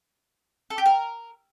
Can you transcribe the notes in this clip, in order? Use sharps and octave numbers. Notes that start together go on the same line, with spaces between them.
A4
G4
A#4